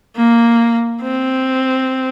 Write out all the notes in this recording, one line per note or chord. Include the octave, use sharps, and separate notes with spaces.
A#3
C4